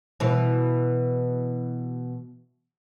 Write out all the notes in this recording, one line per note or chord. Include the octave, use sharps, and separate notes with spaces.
B2 E3